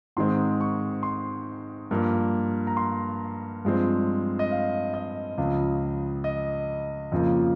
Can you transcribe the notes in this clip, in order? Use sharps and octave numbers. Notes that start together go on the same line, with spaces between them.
G#2 D#3 G#3 C4 C6
C#6
C6
G2 F3 A#3
A#5
C6
G2 F3 G#3 C4
D#5
F5
D#5
C#2 C#3 F3
D#5
F2 C#3 F3 A#3